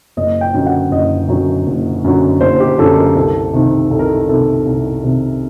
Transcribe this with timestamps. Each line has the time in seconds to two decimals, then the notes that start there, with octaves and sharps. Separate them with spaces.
0.17 F#1 D#5
0.41 G5
0.54 F#2 D3 F#3
0.66 F#5
0.91 F#1 D#5
1.28 F#2 D3 F#3
1.66 F#1
2.04 F#2 D3 F#3
2.41 F#1 C5
2.60 G4
2.79 F#2 D3 F#3 A4
2.97 A#4
3.16 C2 A4
3.53 C3 D#3
3.91 C2 A4
3.99 A#4
4.08 A4
4.28 C3 D#3 A4
4.66 C2
5.03 C3 D#3